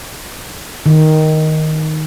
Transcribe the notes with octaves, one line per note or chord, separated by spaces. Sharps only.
D#3